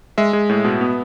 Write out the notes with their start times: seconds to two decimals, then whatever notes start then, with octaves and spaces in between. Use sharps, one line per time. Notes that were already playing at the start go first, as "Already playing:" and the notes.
0.18 G#3 E5
0.33 G#3
0.49 A2
0.64 B2
0.81 B3